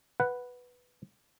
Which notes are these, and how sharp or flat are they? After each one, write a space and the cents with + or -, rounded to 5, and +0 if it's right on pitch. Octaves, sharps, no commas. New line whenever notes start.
B4 +0 F#5 +0